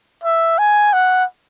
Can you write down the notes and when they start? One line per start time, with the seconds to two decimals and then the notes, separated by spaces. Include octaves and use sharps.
0.24 E5
0.58 G#5
0.93 F#5